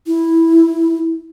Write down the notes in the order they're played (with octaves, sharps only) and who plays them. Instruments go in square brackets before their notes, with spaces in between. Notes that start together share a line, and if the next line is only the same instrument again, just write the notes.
[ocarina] E4